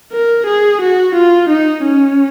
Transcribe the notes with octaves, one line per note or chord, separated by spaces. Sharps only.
A#4
G#4
F#4
F4
D#4
C#4